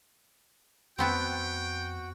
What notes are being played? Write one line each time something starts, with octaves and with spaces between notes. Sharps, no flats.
F2 A3 B3 C4 F#4 G5